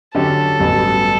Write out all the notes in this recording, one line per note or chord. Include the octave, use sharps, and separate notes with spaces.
D3 F#3 C#4 G4 A4
A1 G2 F#3 B3